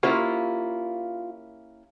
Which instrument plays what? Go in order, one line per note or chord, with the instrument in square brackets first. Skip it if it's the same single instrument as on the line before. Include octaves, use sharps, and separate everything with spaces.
[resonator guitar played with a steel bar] A#3 C#4 E4 [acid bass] F4 [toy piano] G4 C5 F#5